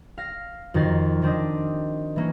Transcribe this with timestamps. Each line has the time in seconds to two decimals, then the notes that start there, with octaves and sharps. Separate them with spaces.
0.18 F5 A#6 C7
0.74 F2 D#3 F#4 A#4 A6 C7
1.22 D#3 C4 D4 D#5
2.16 E3 A#3 C#4